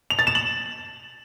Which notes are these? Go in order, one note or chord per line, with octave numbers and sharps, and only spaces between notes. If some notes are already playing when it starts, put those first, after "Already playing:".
F7
A6
E7
F#7